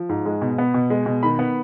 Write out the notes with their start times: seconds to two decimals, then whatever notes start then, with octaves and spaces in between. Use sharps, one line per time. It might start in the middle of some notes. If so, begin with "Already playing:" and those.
Already playing: F3
0.09 G#2
0.25 G#3
0.42 B2
0.58 B3
0.74 B2
0.90 G#3
1.06 B2
1.23 D#3 B5
1.39 B3